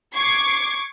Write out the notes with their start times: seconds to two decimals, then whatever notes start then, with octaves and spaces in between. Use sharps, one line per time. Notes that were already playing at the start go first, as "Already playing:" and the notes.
0.15 C#6 D6 G#6 C7